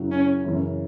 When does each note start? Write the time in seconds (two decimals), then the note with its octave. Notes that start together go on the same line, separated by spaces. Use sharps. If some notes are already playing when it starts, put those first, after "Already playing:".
Already playing: F#2 C#3 F#3 E4
0.11 C#4
0.44 F#2 C#3 E3 C#4 E4